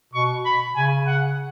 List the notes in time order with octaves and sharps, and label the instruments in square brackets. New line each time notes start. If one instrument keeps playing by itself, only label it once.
[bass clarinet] B2 [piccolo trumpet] C#6
[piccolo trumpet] B5
[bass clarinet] C#3 [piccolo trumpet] G#5
[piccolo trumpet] F#5